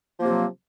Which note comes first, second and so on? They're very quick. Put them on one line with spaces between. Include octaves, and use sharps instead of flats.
F3 A#3 C3 F#3